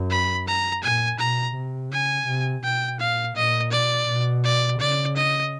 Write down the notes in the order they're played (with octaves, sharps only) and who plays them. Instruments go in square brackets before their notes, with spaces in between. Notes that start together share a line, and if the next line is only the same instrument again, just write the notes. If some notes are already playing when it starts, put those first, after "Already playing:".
Already playing: [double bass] F#2
[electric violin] B5
A#5
[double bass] A#2 [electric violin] G#5
[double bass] B2 [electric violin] A#5
[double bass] C3
[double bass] C#3 [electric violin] G#5
[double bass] C3
[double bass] B2 [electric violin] G5
[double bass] A#2 [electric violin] F5
[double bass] A#2 [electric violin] D#5
[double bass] B2 [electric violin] D5
[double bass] B2
[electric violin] D5
[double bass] C#3 [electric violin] D5
[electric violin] D#5